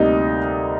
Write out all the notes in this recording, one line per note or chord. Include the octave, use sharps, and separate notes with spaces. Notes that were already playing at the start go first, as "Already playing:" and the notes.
Already playing: D2 C3 G3 A#3 D#4